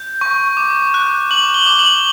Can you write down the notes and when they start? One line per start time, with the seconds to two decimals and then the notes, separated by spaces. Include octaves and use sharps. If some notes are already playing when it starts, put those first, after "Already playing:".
Already playing: G6
0.21 C#6
0.57 D6
0.94 F#6
1.31 D6 F#7
1.54 G7
1.66 D6
1.79 F#7